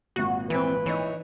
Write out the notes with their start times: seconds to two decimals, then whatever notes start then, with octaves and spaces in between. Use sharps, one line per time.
0.16 G#1 A#2 F#4
0.50 E2 E3 C4 B4
0.86 E3 D#4 E4 C#5